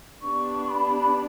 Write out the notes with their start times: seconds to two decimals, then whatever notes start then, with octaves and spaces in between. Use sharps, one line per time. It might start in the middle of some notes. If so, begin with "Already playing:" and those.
0.22 B3 D4 G4 C#6
0.70 B5